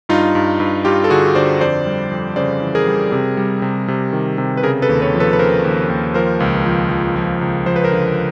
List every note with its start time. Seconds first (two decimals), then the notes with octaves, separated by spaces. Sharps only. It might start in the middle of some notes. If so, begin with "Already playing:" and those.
0.09 G2 D#4 F4
0.35 G2
0.60 G2
0.85 G2 F4 G4
1.04 A4
1.10 D3 F#4 G#4
1.35 D3 C5 D5
1.60 F2 C5 D5
1.86 G3
2.11 F2
2.36 C#3 C5 D5
2.61 E3
2.75 G#4 A#4
2.87 G3
3.12 C3
3.37 G3
3.62 C3
3.88 C3
4.13 D#3
4.38 C3
4.57 B4
4.63 C#3 G#4 A#4
4.82 A4 B4
4.89 D#2
5.02 B4 C#5
5.14 F3
5.20 A4 B4
5.33 B4
5.39 C#3 A#4 C5
5.65 D#2
5.90 D#2
6.14 F3 A#4 C5
6.40 C#2
6.66 F3
6.91 F3
7.16 F3
7.41 C#2
7.66 F3 C5
7.76 B4
7.84 A#4 C5
7.91 D3